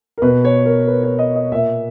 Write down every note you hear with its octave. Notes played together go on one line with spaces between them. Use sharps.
A#4
B2 B4
C#5
A#4
B4
C#5
D#5
D#5
A#2 E5